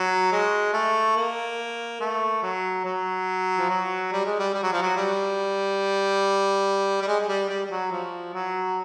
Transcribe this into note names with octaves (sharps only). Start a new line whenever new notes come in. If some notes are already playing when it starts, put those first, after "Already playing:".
Already playing: F#3
G#3
A3
A#3
A3
F#3
F#3
F3
F#3
G3
G#3
G3
G3
F#3
F3
F#3
G3
G3
G#3
G#3
G3
G3
G3
F#3
F3
F#3